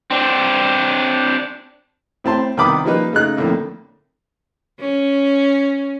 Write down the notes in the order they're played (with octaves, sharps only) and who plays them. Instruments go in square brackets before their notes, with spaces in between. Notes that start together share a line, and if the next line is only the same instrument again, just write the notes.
[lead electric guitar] C4 D4
[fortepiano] A2 C4 A5 C6
C2 D#3 B3 B5 D6 D#6
F3 G3 A#3 D#4 B4
C#3 A3 D#4 F#6
F2 A2 D3 A#3
[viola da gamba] C#4